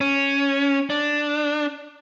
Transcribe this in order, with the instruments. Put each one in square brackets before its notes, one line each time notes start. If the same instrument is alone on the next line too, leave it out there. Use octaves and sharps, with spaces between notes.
[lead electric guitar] C#4
D4